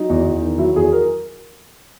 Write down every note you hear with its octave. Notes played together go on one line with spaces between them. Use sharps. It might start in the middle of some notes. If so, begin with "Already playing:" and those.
Already playing: F#3 D#4
E2
E2
D#3
F#3 E4
E2 G#4
A#4